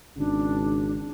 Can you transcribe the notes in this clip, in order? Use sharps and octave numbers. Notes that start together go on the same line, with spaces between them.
G#1 C#3 D4